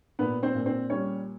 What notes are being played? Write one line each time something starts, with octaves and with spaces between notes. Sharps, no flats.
A#2 B3 B4
C4 C5
A#2
C4 C5
G3 C#4 C#5